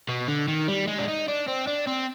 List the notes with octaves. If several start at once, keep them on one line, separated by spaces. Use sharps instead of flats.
B2
D3
D#3
G3
G#3
D4
D#4
D4
C4
D4
C4